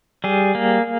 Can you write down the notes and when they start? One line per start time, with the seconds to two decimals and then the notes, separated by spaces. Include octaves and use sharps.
0.24 G3 G#4
0.55 A#3